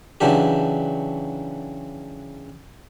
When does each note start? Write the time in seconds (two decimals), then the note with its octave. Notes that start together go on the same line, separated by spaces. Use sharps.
0.21 C#3 E3 F#3 D4 G4